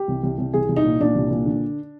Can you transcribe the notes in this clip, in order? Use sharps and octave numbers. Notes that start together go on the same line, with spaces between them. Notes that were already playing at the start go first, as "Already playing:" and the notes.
Already playing: G4
C2
C2
C2
C2 G#4
C2
D#4
A#2
A#2 D4
C2
A#2
D3